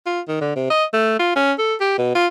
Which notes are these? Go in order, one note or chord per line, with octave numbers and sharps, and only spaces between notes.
F4
D#3
D3
C3
D#5
A3
F4
C#4
A4
G4
B2
F4